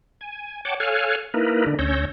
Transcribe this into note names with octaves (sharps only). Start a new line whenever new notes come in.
G#5
C#5 F#5 G5 A5 D6
A4 C#5 F5 G#5 F6 F#6
A#3 D#4 E4 A#4 B4
D3 D4
D2 C#4 C#5 E6 G6 A#6